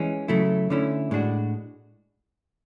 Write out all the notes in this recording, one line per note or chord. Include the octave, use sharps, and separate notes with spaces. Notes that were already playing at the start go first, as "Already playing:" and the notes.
Already playing: E3 G#3 C#4
C#3 F#3 A3 E4
D3 A3 C#4 E4
A2 G#3 D4 F#4